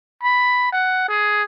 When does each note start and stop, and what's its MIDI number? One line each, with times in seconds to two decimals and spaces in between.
0.23 0.71 83
0.72 1.05 78
1.08 1.43 68